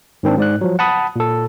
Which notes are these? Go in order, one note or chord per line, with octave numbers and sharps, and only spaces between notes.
G#2 D#3 C4 D4
G#2 D5 F#6
F3 F#3
F#5 A5 B5 D#6
A#2 A4